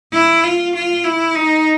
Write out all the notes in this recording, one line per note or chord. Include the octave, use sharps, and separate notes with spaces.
E4
F4
F4
E4
D#4